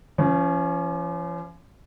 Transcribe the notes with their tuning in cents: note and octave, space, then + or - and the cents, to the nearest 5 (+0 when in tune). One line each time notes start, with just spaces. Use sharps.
F3 -45 C#4 +0